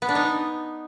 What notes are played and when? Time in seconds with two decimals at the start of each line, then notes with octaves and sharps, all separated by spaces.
0.02 B3
0.09 D4
0.15 D#4